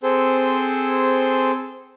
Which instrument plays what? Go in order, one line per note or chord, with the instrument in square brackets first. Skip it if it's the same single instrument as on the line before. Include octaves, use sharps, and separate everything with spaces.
[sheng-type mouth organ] C4 G#4 A4 C5